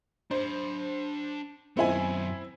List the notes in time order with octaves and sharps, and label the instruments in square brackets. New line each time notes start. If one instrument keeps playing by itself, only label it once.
[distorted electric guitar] D4 B5 [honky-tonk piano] C5
[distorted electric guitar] F#2 B3 [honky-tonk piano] C4 E4 G#5